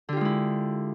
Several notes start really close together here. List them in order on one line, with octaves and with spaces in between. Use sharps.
D3 G4 F4 G#3 E4